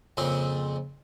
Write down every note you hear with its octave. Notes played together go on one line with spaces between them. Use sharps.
F2 A#2 C#3 C4